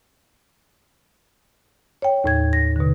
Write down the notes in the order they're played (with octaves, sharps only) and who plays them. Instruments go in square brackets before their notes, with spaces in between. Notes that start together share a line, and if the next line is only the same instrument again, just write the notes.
[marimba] C#5 G5
D#2 A2 G#6
A#6
B2 D3